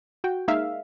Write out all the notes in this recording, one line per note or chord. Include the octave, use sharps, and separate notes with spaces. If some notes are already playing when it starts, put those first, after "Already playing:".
F#4 G5
G#3 A#3 D#4 E5 F5